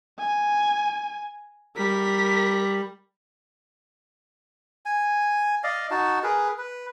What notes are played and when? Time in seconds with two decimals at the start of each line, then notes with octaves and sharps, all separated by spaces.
0.19 G#5
1.77 G3 A#4 B6
4.85 G#5
5.63 D5 D#5 F5
5.91 D#4 F#4 A5
6.23 G#4 A#4 B4
6.58 B4